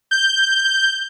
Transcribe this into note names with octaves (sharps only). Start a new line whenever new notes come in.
G6